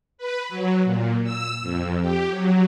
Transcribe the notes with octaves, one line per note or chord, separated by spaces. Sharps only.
B4
F#3
A#2
E6
F2
G4
F#3